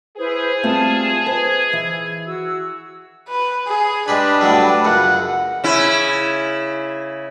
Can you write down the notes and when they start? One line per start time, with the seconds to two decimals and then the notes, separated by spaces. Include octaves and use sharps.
0.18 E4 G#4 B4 C5
0.63 G3 A3 C4 F4 A5
1.26 B4 C5 D#5 G#6
1.73 E3
2.27 F#4 E6
3.28 B4
3.67 G#4
4.08 G#3 D4 G4 B4 B5
4.41 A2 F#3 G3
4.85 C#2 F#2 F#5
5.64 C#3 E4